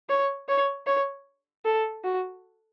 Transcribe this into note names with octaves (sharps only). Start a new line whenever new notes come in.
C#5
C#5
C#5
A4
F#4